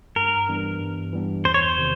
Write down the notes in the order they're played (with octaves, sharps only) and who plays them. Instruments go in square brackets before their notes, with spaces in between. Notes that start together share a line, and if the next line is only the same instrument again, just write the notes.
[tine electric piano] G2 [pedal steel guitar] A#4
[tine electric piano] E3 G3 B3 D4
G2
E3 G3 B3 D4
[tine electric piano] E2 [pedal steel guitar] C5
[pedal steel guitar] C#5
C5
[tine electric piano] C3 D#3